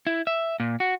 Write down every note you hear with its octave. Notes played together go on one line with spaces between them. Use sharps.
E4
E5
A#2
F#4